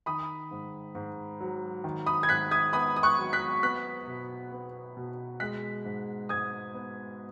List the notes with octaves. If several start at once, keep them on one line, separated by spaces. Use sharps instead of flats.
D#3 B5 D#6
G#2
G#2
F#3
D#3
B5 D#6
G#6
G#2 F#6 B6
D#6 G#6
B3 B5 D#6
D#6
C#6 F#6
F#3
F#6 B6
B3 F#6 B6
B2
B3
B2
G#3 F#6 B6
G#2
G#2 D#6 G#6
B3